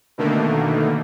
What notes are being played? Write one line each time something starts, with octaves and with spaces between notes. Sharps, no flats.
B2 D3 D#3 A3 A#3